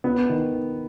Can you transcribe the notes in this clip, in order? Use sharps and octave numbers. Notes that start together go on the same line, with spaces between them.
B3
D#3